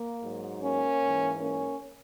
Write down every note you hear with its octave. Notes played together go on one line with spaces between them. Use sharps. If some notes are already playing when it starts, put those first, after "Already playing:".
Already playing: A#3
G#2 F#3
A#3 C#4
G#2 E3
A#3 C#4